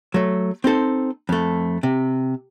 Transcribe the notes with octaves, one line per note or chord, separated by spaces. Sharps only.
F#3 A3
C4 D#4 A4 C5
F2 A3
C3